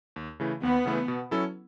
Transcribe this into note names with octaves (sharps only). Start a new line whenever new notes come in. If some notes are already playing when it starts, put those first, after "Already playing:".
D#2
C#3 E3 A3
D#2 B3
C#3 E3 A3
B2
F#3 C#4 E4 A4